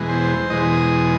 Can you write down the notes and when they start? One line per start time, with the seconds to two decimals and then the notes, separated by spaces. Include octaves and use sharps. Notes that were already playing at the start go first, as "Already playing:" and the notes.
Already playing: E2 B2 G#3
0.09 C5
0.50 E2 B2 G#3 D#5